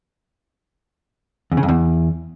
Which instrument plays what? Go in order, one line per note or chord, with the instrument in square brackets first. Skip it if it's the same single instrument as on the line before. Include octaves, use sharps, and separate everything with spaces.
[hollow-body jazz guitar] E2
C#3
F2
E2